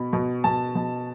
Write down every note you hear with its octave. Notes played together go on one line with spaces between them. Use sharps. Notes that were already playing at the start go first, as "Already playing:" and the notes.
Already playing: B2 B5
B2
B2 A5
B2